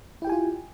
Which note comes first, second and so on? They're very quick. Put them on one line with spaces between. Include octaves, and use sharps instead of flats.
E4 G5 G4 G#5 F4